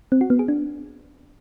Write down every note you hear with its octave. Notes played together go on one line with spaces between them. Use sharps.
C4
F#4
B3
G#4
D4